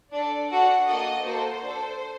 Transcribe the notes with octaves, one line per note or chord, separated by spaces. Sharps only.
D4 A4 D5
D4 F#4 A4 F#5
A#3 F#4 A4 D#5
A#3 F#4 A4 C5
D4 A4